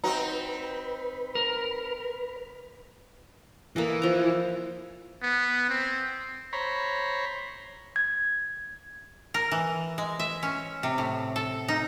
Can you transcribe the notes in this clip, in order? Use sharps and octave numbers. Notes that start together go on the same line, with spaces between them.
C4 D#4 F#4 B4 C#5 A#5
A#4
E3 A#3 A4 D#5
F3 A#5
B3
C4
C5 C#5 A#5 B5
G#6
A#4
E3
G#3
E5
C#4
C3
A2
A4
D#4